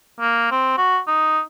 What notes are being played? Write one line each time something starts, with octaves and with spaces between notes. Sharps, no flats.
A#3
C4
F#4
D#4